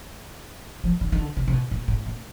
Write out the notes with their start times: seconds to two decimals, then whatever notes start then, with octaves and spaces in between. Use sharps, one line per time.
0.84 F3
1.01 D#3
1.12 D#3
1.19 D3
1.37 C3
1.48 C3
1.53 B2
1.71 A#2
1.88 A2
2.06 A#2